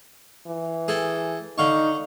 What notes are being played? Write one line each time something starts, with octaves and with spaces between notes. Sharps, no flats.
E3
G#4 A4 G5
D3 D#4 F5 C#6